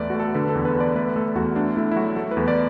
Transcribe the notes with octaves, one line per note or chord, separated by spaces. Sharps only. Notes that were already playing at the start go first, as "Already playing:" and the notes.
Already playing: E2 A3 B4 D5
F#4
A3 A4
D3 B4
A4
E2
B4
E2
D5
A3 B4
A3 A4
E2 F#4
A3 D4
A3 E4
E4
F#3 F#4
A3 A4
B4
E2
D5